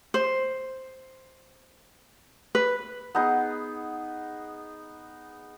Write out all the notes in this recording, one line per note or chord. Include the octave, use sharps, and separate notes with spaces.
C5
B4
B3 D#4 G#4